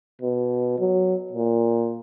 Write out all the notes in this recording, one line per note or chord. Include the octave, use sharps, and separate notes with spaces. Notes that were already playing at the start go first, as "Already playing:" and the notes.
B2
F#3
A#2